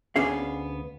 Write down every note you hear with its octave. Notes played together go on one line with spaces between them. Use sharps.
D2 B3 C#4 D4 G#4 F5